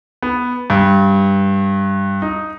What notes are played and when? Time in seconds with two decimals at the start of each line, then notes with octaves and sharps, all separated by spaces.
0.22 B3
0.70 G2
2.22 D#4